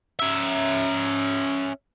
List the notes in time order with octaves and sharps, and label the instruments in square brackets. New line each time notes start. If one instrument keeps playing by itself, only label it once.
[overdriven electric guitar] C#4 E5